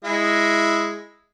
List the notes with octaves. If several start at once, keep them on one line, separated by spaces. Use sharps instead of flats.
G#3 E4